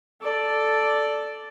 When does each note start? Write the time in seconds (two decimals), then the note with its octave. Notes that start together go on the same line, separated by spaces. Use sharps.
0.22 A4 D5